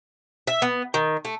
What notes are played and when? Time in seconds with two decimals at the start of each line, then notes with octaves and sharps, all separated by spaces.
0.47 E5
0.62 B3
0.94 D#3
1.25 A3